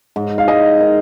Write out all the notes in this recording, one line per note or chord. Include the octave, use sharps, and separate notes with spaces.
G#2
F5
G#3 D#5
D#3